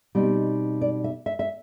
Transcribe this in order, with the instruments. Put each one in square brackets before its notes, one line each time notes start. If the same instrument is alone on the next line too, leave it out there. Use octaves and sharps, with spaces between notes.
[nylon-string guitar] B2 G3 C4 D#4
D5
E5
E5
E5